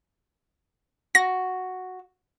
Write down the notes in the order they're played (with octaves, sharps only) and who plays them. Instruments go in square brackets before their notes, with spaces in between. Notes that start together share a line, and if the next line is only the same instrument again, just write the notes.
[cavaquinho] F#4 [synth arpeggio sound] A#6